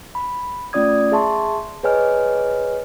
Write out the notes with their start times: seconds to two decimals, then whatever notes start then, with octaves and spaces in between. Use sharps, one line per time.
0.15 B5
0.73 A3 C#4 F4 D5 D#6 G#6
1.12 G#4 E5 A5 C6 C#6
1.83 G#4 B4 C#5 D#5 G#5 F6